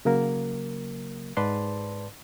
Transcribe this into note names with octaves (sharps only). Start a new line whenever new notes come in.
C#3 F#3 A#3 A#4
G#2 B4 D5 A5 C6